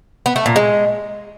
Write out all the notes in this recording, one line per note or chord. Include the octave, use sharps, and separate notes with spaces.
B3
A3
A#2
G#3